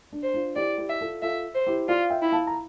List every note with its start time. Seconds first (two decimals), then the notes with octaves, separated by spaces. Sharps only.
0.13 D4
0.23 C5
0.34 D4 F4
0.56 E4 G4 D5
0.78 E4 G4
0.90 E5
1.01 F4 A4
1.22 F4 A4 E5
1.55 C5
1.67 E4 G4
1.88 F4 D5 F5
2.10 E5 G5
2.22 E4
2.32 F5 A5
2.47 A#5